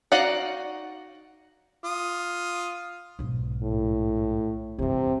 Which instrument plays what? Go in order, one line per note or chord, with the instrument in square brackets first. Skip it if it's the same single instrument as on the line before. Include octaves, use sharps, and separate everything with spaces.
[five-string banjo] D#4 F#4 D5 F5 F#5
[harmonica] F4 D#6
[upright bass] B1 G#2
[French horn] A2
[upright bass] E2 G2 [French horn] C3